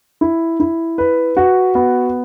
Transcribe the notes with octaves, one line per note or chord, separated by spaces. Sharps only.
E4
E4
B4
F#4
B3